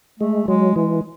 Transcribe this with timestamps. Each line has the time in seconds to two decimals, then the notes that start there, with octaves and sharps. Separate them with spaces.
0.19 G#3 A3
0.48 F#3 G#3
0.76 E3 G#3